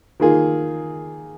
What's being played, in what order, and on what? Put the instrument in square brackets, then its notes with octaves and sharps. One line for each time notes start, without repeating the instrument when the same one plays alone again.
[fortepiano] D#3 A#3 F4 G#4